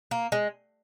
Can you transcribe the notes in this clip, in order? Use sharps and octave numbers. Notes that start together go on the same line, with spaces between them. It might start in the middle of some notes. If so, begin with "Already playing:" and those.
A#3
G#3